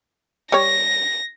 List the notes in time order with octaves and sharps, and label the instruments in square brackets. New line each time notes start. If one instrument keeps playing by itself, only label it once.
[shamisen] G3 C#5 [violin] A#6